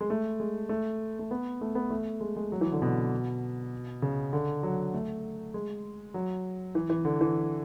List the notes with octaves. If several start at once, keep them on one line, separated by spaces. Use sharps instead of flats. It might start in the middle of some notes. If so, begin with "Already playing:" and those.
G#3
A3
G#3
A3
A3
B3
A3
B3
A3
G#3
G#3
F#3
E3
D3
B2
C#3
D3
F#3
A3
G#3
F#3
E3
E3
D3
E3